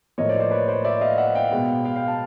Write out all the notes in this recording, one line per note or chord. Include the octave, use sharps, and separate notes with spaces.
A2 F3 A#3 C#5 D#5
C5 D5
C5 D5
B4 C#5
C5 D5
D5 E5
D#5 F5
E5 F#5
F5 G5
B2 G#3 B3
F5 G5
F5 G5
G5 A5